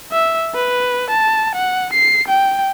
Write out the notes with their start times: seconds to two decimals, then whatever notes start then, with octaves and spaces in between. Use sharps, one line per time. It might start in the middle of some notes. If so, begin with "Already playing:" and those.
0.12 E5
0.55 B4
1.11 A5
1.56 F#5
1.94 C7
2.28 G5